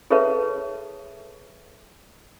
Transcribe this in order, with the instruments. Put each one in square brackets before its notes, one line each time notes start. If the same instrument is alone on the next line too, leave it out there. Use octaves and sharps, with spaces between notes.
[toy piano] G#4 A4 B4 C#5 E5 A5